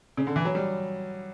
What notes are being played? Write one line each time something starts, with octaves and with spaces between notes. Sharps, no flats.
C#3
D3
E3
F#3
G3